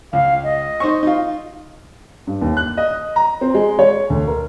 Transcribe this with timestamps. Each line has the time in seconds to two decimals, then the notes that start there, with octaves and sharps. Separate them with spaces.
0.13 C#2 F5
0.43 D#5
0.80 D#4 C5 C#6
1.03 D#4 F4
2.27 G2
2.41 D#2
2.57 F#6
2.77 D#5
3.16 A#5
3.41 C4
3.54 G#3
3.79 C#5
4.10 D2
4.28 A#4